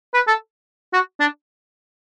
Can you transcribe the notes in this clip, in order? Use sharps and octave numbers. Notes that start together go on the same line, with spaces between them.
B4
A4
F#4
D4